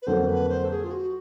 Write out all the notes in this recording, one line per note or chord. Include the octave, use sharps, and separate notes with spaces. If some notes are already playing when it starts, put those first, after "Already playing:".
B4
F2 D3 F#3 A#3 C5
B4
C5
A4
G#4
F4
F#4